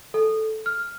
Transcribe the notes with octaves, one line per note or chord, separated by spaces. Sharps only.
A4
F6